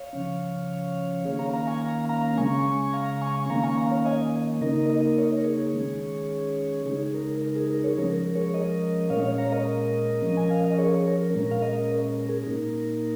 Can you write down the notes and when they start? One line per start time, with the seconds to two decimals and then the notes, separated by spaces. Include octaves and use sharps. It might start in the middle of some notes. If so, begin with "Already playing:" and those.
Already playing: C#5 F5
0.13 C#3 F3 C#4
1.25 D#3 A#3 C#4 G#4 C#5
1.39 F5 A#5
1.53 F5 A#5
1.67 G#5 C#6
1.81 F5 A#5
2.09 F5 A#5
2.37 C#3 G#3 C#4 G#5 C#6
2.93 F5 A#5
3.21 G#5 C#6
3.40 C#6
3.49 D#3 A#3 C#4 F5 A#5
3.63 G#5 C#6
3.77 F5 A#5
3.91 C#5 F5
4.05 D#5 G#5
4.61 C#3 A#3 D#4 A#4 D#5
4.90 A#4 D#5
5.18 C#5
5.31 A#4
5.44 G#4 C#5
5.74 D#3 G#3 C#4
6.86 C#3 G#3 D#4 G#4
7.07 G#4
7.14 A#4
7.42 A#4
7.56 G#4
7.70 A#4
7.84 G#4 C#5
7.98 F3 G#3 C#4 A#4
8.16 A#4
8.35 G#4 C#5
8.54 A#4 D#5
9.10 A#2 G#3 C#4 C#5 F5
9.24 C#5 F5
9.38 F5 A#5
9.47 C#5
9.52 A#4 D#5
10.22 F3 C#4
10.37 G#5
10.51 F5
10.64 D#5
10.78 G#4 C#5
11.07 A#4
11.34 A#2 G#3 C#4 A#4
11.51 F5
11.62 A#4 D#5
12.18 A#4
12.29 G#4
12.39 A#4
12.46 A#2 A#3 D#4